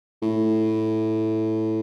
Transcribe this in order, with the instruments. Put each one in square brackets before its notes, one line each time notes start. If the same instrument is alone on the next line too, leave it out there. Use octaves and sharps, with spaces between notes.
[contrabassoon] A2